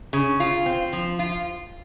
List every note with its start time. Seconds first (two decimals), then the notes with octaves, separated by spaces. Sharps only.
0.13 C#3
0.40 F4
0.66 C4
0.93 F3
1.19 F4